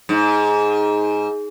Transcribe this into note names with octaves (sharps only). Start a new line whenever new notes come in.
G#2